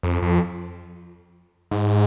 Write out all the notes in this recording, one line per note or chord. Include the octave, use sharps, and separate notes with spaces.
F2
F2
G#2